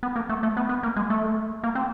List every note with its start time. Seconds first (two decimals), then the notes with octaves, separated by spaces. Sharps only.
0.03 B3
0.16 A#3
0.29 A3
0.43 A3
0.57 B3
0.69 B3
0.83 A#3
0.96 G#3
1.10 A3
1.64 A#3
1.75 C4